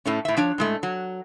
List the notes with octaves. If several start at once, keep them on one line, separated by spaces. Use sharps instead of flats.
A2 A3 C#4
A2 E5
F3 D4 C#5
A2 G#3 A3
F#3